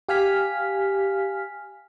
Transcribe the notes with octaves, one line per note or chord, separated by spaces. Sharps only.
G4 F5 G#5 F6 B6